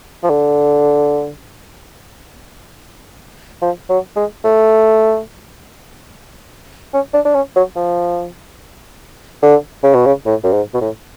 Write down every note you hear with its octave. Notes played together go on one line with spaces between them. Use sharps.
F3
D3
F3
F#3
G#3
A3
C#4
D4
D4
C#4
F#3
F3
D3
C#3
B2
C#3
A2
F#2
G#2
B2
A2